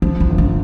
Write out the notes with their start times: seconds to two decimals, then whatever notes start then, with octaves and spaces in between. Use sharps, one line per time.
0.02 F3 D4
0.20 E4
0.30 G1
0.38 D4